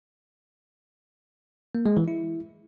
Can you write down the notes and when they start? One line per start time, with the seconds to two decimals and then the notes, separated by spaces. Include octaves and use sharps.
1.75 A#3
1.86 G#3
1.97 E3
2.08 E4